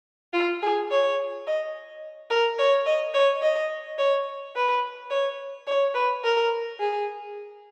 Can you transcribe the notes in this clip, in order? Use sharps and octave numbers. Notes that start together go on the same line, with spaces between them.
F4
G#4
C#5
D#5
A#4
C#5
D#5
C#5
D#5
C#5
B4
C#5
C#5
B4
A#4
G#4